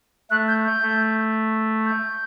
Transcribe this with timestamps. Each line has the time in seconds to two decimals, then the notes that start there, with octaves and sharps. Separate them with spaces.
0.31 A3 F#6
0.48 G6
0.65 G6
0.82 A3
1.86 G6